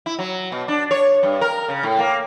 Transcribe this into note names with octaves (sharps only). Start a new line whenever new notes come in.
E4
F#3
B2
D4
C#5
G2
A#4
C#3
A2
A#3